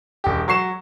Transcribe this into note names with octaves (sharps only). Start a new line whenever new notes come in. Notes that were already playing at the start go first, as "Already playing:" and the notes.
E1 G4
F#3 C#6 C7 E7